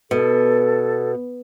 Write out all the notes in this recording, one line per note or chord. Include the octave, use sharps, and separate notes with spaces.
B2 A4